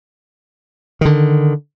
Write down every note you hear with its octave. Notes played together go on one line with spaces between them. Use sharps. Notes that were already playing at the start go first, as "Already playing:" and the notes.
D3 D#3